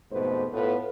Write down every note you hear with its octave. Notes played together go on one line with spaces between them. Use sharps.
F2 G#2 B2 A3 B4 C5
A2 B3 F4 A4 B4